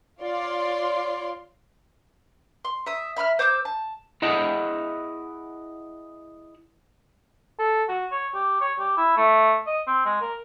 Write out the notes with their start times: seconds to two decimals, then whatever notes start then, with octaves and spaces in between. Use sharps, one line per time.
0.22 F4 C#5 D5 C6
2.65 C6
2.86 E5 D#6
3.17 E5 B5 E6 F6
3.39 C5 D6 E6 G6
3.65 A5
4.22 E4 G#4 D#5 F#5 B5
7.59 A4
7.88 F#4
8.12 C#5
8.34 G4
8.61 C#5
8.79 G4
8.97 E4
9.17 A3
9.67 D#5
9.87 C4
10.05 G#3
10.21 A#4